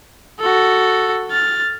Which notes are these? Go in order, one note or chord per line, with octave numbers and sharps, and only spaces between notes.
F#4 A4
F6 A6